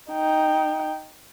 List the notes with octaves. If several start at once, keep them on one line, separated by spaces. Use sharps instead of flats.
D#4 G5